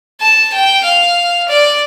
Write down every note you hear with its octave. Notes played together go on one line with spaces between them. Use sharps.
A5
G5
F5
D5